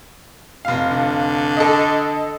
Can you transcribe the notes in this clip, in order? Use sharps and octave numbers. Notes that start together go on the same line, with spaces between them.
F1 F5
D3
A4 D#5